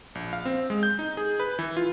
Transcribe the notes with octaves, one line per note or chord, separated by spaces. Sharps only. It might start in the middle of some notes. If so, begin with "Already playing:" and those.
A#1
F5
C4
G#3
G6
D#4
G#4
B4
E3
F4